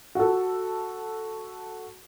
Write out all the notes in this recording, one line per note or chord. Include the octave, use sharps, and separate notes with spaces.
F#4 A4